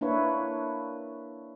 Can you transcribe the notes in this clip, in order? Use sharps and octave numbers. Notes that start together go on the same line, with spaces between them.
A#3 D4 E4 B4 C#5